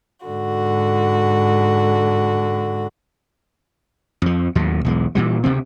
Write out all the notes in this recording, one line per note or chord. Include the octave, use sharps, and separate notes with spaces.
G#2 D3 F#4
F2 F3
D#2 A2 F#3
B1 E2 G#3
A#2 E3 G3
D2 C3 G3 C4